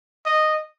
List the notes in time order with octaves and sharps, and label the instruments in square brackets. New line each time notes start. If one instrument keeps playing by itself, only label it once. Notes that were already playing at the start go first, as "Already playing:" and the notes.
[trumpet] D#5